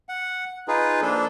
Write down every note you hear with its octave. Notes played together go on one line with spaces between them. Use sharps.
F#5
D#4 F4 G#4 B4
F3 A#3 D4 A4